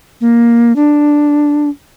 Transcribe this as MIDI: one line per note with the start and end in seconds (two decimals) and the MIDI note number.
0.21 0.75 58
0.76 1.69 62